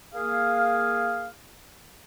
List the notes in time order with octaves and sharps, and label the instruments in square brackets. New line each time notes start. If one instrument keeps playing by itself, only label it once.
[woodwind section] A#3 G#4 F5